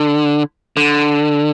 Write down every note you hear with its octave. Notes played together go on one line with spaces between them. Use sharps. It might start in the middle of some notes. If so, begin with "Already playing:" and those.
Already playing: D3
D3